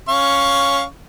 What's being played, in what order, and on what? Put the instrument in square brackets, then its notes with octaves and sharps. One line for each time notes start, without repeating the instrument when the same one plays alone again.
[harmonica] C#4 F5 C#6